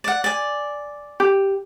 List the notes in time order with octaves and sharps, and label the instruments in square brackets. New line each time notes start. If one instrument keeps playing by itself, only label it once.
[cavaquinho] D5 F#5
D5 G#5
[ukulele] G4